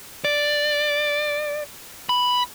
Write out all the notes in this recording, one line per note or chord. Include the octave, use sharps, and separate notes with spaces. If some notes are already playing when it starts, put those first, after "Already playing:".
D5
B5